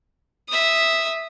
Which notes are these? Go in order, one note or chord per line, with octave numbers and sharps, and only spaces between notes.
E5 D#6